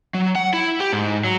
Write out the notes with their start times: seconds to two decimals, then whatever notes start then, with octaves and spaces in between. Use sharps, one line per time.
0.14 F#3
0.35 F#5
0.53 E4
0.80 G4
0.93 G#2
1.24 F#3